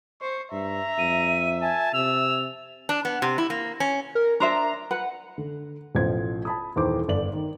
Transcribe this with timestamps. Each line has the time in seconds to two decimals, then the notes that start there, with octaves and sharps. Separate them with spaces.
0.21 C5 C#6
0.52 G2 E5 A#5
0.99 F2 D#7
1.62 G#5 A5
1.94 C3 E6 F7
2.89 D4
3.05 B3
3.22 C3
3.38 E4
3.50 A#3
3.80 C#4
4.15 A#4
4.40 D4 C5 E5 A#5
4.91 B4 F#5
5.38 D3
5.95 A1 B2 F3 C5 G#6
6.45 A5 B5 D#6
6.76 D#1 D#2 E3 C5 D6
7.08 G1 D5 F#7
7.33 D#3